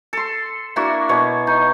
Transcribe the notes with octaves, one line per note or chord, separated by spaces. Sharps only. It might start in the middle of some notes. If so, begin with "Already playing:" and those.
A4 C6
A#3 D4 E4 F#4
B2 C#5
D#4